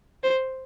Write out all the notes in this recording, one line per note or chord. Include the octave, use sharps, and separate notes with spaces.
C5